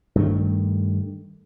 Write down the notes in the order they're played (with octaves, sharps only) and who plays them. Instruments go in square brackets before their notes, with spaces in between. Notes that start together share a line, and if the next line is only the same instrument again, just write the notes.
[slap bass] G2 D#3 A3